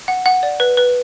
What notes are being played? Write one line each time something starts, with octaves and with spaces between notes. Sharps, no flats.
F#5
F#5
D5
B4
B4